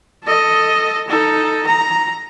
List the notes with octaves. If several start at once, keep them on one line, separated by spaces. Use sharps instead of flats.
A4 D#5
D#4 A4
A#5